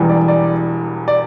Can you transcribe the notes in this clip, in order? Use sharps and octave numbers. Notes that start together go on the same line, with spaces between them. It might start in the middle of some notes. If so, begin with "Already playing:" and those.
Already playing: E1 E2 E3 G3
D5
D5
D5